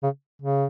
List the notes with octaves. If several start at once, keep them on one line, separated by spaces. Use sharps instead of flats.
C#3
C#3